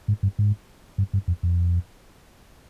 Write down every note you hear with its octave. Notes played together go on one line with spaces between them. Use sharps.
G#2
G2
G#2
G2
G2
F2
F2